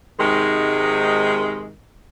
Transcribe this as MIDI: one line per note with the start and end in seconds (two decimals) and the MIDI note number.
0.19 1.70 44
0.19 1.70 48
0.19 1.70 51
0.19 1.70 56